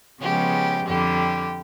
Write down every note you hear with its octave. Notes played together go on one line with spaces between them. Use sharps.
C#3 F3 G#3 B3 G4
F2 D3 G3 G4